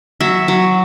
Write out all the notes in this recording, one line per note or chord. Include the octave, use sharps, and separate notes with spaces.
F#3 E5
F#3